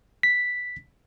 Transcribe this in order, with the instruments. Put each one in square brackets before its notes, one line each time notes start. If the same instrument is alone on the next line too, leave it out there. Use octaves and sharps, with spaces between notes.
[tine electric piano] B6